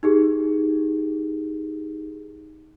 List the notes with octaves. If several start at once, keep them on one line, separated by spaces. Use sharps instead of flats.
D#4 G4 G#4